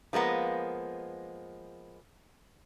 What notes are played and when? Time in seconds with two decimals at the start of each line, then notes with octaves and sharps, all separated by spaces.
0.13 F3 G#3 A#3 B3